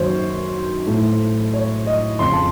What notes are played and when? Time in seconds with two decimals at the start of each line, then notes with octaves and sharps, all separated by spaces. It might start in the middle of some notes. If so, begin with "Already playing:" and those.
Already playing: F#2 D#3 F#3 A#3 C5 C#5
0.87 A2 A3
1.53 C#5
1.86 D#5
2.19 F2 C#3 F3 C6
2.33 A5